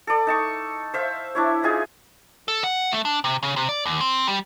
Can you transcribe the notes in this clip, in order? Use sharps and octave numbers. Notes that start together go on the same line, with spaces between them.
A4 D5
D#4 A5 C#6
C5 E5 F5
D4 E4 C#5
D#4 F4 G#4 G#5
A4
F#5
A3
D4
C3
C#3
C3
D5
D#2
C4
G3